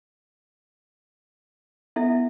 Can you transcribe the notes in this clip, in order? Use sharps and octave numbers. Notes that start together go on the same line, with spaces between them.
B3 E4 A4 E5